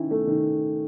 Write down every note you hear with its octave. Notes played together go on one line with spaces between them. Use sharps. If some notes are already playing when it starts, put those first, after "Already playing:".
Already playing: D#3 C#4 E4
A3
D#3